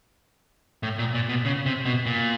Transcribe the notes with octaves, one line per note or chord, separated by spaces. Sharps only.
A2
A#2
A#2
B2
C#3
C3
B2
A#2